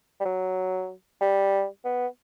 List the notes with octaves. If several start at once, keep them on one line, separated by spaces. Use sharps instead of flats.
G3
F#3
G3
B3